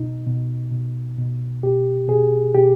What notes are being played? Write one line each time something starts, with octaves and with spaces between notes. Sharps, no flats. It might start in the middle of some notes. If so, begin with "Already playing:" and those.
Already playing: B2 D#4
B2
B2
B2
B2 G4
B2 G#4
B2 G4